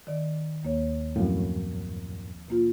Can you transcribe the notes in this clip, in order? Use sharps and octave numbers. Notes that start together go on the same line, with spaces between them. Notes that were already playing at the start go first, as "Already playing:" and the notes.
D#3 D5
D#2 A#3 C#5
F#2 A2 F3 C4
B2 A#3 F4